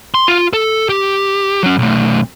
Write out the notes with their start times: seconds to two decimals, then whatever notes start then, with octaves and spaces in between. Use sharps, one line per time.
0.14 C6
0.28 F4
0.53 A4
0.89 G4
1.63 F#3 C#4
1.78 B1 A3